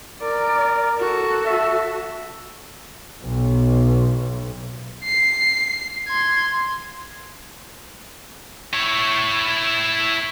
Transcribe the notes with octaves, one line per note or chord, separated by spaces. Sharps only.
A#4 D5
F#4 A4
E5
B1
C7
C6 G#6
E4 C#5